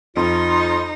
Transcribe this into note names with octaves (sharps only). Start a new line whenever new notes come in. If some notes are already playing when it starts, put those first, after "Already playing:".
F2 D#4 F4 C6